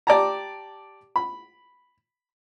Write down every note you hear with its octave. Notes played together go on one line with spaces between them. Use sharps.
G4 D5 A5 A#5
B5